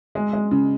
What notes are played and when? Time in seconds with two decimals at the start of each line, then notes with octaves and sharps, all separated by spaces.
0.15 G#3
0.33 G#3
0.51 C#3